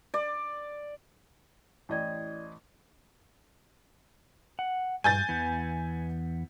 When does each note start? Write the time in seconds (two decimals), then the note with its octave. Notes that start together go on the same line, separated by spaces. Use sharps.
0.14 D5
1.89 A1 E4 D5 D#5 G5 G#6
4.59 F#5
5.04 G2 G#5 G6 A6
5.29 E2 E3 B3